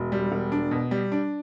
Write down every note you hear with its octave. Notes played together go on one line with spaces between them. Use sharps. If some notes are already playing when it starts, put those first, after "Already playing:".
Already playing: E1
G3
E1
D4
B2
G3
D4